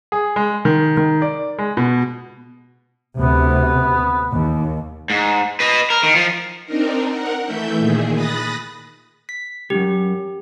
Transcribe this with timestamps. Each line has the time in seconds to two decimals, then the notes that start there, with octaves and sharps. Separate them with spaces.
0.12 G#4
0.36 G#3
0.65 D#3
0.97 D#3
1.22 D5
1.59 G#3
1.77 B2
3.20 D2 C3 B3
4.32 D#2
5.10 G#2
5.60 B4 D#5
5.90 A#4
6.03 D#3
6.16 F3
6.65 C4 D4 D#4 A#4
7.10 A#4 F#5
7.44 E3 A3 E5 G6
7.78 A#2 D#3 G#4
8.13 B5 D#6 F#6 A6 A#6
9.29 B6
9.70 C#2 F#2 G4